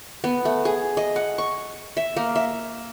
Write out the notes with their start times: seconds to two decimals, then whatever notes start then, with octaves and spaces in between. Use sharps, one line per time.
0.24 B3
0.45 A3
0.65 G#4
0.97 D#5
1.16 F#5
1.38 C#6
1.97 E5
2.17 A#3
2.36 E5